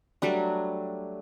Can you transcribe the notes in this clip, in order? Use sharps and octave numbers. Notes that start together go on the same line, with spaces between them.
F#3 G3 A3 D4 F#4